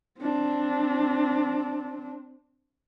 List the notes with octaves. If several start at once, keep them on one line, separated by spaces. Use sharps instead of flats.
C4 D4